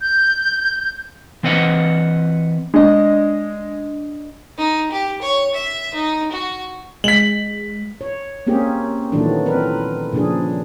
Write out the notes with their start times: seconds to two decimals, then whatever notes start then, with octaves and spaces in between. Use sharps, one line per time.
0.01 G6
1.43 E3 C4 B4 D#5 F#5
2.74 G#3 D4 D#5
4.58 D#4
4.92 G4
5.22 C#5
5.54 E5
5.94 D#4
6.32 F#4
7.04 G#3 B6 F#7
8.01 C#5
8.47 A#3 C4 C#4 G4 G#4
9.12 A#2 D#3 E3 F#3 A3 D4
9.46 C4 A#4 B4
10.13 A#2 C#3 F3 D4 G#4